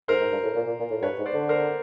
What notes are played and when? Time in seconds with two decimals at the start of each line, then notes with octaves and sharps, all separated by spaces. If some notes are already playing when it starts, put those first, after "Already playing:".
0.08 G#2 A#4 C5
0.20 G#2
0.32 G2
0.43 A2
0.56 A#2
0.67 A#2
0.79 A#2
0.91 A2
1.02 G2 B4 C#5
1.19 G#2
1.26 C5 D5
1.34 D3
1.49 A#4 C5